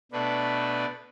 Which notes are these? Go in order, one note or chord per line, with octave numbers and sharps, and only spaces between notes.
B2 A3 D4 B4